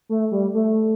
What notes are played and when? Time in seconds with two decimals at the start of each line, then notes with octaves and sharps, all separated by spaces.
0.09 A3
0.31 G3
0.54 A3